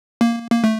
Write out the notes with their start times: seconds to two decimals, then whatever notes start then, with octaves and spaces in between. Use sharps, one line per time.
0.21 A#3
0.51 A#3
0.64 A3